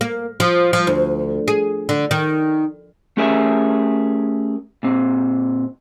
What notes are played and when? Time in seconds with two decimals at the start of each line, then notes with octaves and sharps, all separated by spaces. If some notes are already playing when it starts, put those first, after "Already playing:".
0.01 A#3
0.40 F3
0.73 F3
0.87 D2
1.48 G#4
1.89 D3
2.11 D#3
3.17 A3 C#4 G4 G#4 A#4 E5
4.83 A#2 C4